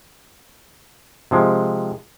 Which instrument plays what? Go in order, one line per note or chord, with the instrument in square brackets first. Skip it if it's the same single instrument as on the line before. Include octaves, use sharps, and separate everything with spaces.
[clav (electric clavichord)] C3 F3 G#3